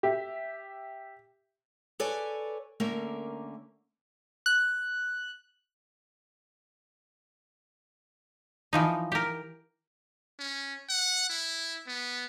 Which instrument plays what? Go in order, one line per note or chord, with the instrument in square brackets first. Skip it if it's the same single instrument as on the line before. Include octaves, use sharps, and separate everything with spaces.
[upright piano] G4 E5
[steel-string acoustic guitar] A4 B4 C#5 D5 G#5
D3 A3 A#3 C#4 A#4
[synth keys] F#6
[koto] E3 F3 D#4
G4 A#4
[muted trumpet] C#4
F#5
E4
B3